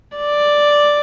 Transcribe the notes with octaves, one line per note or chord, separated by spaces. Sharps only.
D5